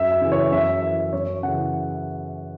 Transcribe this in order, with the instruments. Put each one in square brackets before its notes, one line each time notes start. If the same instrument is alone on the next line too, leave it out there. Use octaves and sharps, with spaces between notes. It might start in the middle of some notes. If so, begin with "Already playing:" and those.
Already playing: [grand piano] F#2 E5
E5
C#3 E3
C#5
F#2 E5
E3 E5
F#2 C#5
C#3 E3 F#5